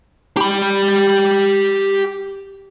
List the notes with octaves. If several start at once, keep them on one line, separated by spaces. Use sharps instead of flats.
G4 B5